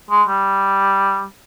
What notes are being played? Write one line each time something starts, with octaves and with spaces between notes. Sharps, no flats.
G#3
G3